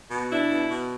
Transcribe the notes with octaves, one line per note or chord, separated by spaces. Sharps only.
B2
D4 E4
B2
B2